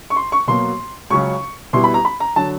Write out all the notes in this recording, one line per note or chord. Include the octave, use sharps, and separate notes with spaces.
C#6
C6
C#6
B2 F#3 A#3 C6
C#2 C#3 F#3 C#6
B2 G3 B3 E4 C6
B5
A#5
B5
A#5
D3 F#3 A5